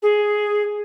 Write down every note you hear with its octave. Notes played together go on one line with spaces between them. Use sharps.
G#4